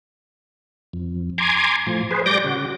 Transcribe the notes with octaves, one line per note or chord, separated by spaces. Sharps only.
F2
G#5 A#5 C6 D6 G#6
A2 F3
G#4 B4 C5
G3 D5 D6 G6 A#6
C#3 F#4